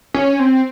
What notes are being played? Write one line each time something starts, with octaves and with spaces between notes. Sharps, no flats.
C#4
C4